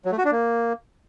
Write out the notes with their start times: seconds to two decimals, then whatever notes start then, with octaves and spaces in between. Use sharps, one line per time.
0.05 F#3
0.12 A3
0.18 F#4
0.25 D4
0.31 A#3